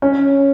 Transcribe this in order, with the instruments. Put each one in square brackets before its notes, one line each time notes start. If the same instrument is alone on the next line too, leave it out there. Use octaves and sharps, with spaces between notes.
[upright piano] C#4